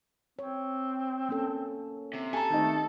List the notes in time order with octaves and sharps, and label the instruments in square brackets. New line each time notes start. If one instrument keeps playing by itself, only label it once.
[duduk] C4 [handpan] C#5
[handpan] A#3 C#4 A4
[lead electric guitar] C3
[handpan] G4 [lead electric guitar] A4 [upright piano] G#5 A#5
[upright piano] D#3 C4 D#4 [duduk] A3